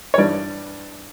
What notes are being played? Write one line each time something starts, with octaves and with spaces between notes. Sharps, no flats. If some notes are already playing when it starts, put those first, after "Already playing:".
C#5
G2 E3 G3 D5